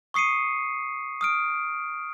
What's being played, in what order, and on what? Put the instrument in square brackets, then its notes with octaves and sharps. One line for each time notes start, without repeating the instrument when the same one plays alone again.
[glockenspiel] C#6 D#6 C7 C#7 D#7
D#6 F6 D7